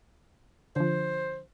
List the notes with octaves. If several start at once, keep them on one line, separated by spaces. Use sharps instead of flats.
D3 F3 C5